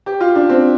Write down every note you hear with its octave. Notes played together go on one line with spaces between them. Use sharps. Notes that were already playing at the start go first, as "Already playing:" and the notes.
G4
F4
D4
C4